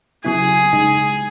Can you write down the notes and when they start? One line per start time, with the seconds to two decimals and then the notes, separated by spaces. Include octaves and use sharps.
0.24 C#3 F#3 B3 E4 G#4
0.73 C#3 G#3 D#4